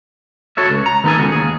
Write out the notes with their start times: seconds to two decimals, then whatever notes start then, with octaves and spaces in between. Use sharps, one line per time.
0.57 F#4 A4 C#5 E5
0.70 C#2
0.86 A#5
1.04 D#3 B3 D#4 A4 G#5
1.18 C#2 D#3 F#4
1.32 D#2 G#4